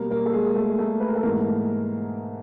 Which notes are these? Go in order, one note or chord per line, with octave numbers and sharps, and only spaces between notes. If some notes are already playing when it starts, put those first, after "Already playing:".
Already playing: B2 G3 A#3 A#4
A#3 A#4
A4
G#3 G#4
A3 A4
G#4
A3 A4
B4
A#4
A4
G#2 E3 A3 A#3 A#4